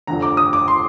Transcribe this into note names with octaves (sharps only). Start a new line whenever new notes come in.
F1 F2 D3 A#5
D6
D#6
D6
C6